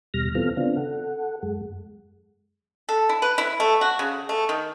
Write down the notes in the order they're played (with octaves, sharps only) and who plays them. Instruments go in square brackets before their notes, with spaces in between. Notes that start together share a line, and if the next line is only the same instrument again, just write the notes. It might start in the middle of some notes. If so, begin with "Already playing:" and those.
[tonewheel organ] D#2 B2 G3 F6 A#6
E3 B3 C4 F4 A4 F6
C#3 B3 C4 D4 F4
A4 F#5
F#2 G#3
[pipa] A4
E4
B4
E4
A3
F#4
C#3
A3
D#3